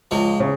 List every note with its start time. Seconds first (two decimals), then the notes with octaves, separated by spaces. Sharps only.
0.11 C#2 F3 G#3
0.40 C#3